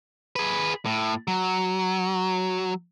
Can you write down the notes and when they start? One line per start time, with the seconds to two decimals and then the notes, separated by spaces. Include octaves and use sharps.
0.36 G#4 B4
0.86 A2
1.28 F#3